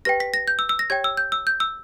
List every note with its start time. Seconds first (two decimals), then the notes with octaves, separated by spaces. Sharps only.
0.05 G4 B4 G5 A#6
0.20 B6
0.34 A#6
0.48 G6
0.59 E6
0.69 E6
0.79 A#6
0.90 G4 C#5 G5 G#6
1.04 E6
1.17 G6
1.32 E6
1.47 G6
1.60 E6